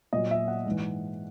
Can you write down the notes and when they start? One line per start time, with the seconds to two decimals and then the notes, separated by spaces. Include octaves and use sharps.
0.13 A#2 F#3 D#5
0.31 E5
0.48 F#5
0.66 G#2 E3